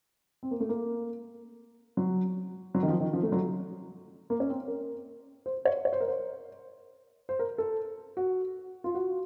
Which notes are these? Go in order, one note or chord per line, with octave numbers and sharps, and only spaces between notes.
C4
A#3
A3
A#3
F#3
F#3
D#3
F3
D#3
F3
A3
F#3
A#3
C#4
C4
A#4
C5
C#5
C#5
C5
A#4
C5
C5
A#4
A4
F#4
F4
F#4